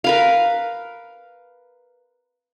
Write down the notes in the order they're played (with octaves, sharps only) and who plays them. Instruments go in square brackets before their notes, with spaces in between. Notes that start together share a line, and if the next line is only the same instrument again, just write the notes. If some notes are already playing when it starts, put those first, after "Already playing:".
[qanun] A#4 B4 F5